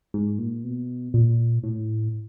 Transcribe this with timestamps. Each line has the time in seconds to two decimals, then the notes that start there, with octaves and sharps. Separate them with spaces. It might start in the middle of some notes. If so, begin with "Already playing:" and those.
0.14 G#2
0.39 A#2
0.64 B2
1.14 A#2
1.64 A2